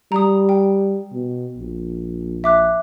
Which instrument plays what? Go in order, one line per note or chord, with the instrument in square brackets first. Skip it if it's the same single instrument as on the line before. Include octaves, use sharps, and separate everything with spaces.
[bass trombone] G3 [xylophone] A#5 D#6
[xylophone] G5
[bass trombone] B2
A#1
[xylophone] E5 D6 F#6